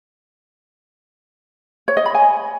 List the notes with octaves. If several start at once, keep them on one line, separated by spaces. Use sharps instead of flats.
C#5
D#5
B5
G#5